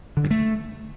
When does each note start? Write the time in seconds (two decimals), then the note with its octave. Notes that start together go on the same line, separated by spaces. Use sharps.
0.17 D3
0.24 G2
0.31 A3